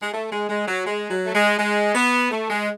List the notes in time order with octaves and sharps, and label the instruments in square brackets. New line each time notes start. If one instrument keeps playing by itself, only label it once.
[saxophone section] G#3
A3
G#3
G#3
F#3
G#3
F#3
A3
G#3
G#3
B3
A3
G#3